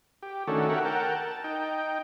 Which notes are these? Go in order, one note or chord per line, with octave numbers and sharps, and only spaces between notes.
G4
D#3 A3 C#4 D4 F#4 A4
F#4 G4 A#4 C#5 E5 F#5
A#4 F#5 G5 A5
A5
D#4 G5